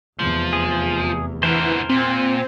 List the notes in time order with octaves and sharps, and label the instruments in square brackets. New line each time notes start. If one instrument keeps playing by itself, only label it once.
[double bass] F1 E2 [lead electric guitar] F3
[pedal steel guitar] G#4
[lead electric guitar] D3 B3 [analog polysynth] E3 [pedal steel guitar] A#4 C5
[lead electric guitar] A#2 [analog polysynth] C4